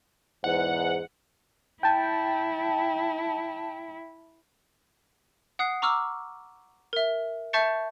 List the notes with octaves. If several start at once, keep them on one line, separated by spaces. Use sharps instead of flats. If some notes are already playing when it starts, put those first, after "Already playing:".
E2 G#2 F#5
E4 G5 A5
F#5 D#6 F#6 C7
A#5 C#6 D6 E6 F6
A#4 E5
E5 A5 C#6 G6 A6 C#7